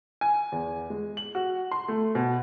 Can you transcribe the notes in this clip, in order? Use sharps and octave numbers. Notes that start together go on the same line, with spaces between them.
G#5
E2
G#3
F#7
F#4
C6
A3
B2